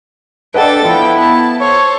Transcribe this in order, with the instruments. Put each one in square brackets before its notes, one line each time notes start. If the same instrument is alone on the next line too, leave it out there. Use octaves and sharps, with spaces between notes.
[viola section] D4 A4 [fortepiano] B4 D#5 F#5 [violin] G5 A6
[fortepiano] F3 [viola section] B3 [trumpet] E4 [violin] G5
[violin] A5
[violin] A4 C5 [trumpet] C#5